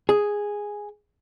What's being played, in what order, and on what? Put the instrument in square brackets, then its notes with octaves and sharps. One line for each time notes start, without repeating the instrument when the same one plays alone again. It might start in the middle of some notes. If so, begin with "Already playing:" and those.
[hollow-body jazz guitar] G#4